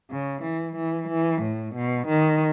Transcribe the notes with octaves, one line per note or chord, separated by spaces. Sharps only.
C#3
E3
E3
E3
A2
B2
D#3